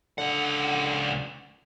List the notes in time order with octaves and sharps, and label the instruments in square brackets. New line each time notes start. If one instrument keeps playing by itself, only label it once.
[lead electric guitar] C#2 F#5 [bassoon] D3